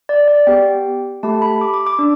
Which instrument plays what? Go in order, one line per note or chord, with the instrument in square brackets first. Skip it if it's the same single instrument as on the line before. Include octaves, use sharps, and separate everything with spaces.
[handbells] D5
D5
B3 G4 G5
A3 G4 A5
B5
D6
D6
D6
D4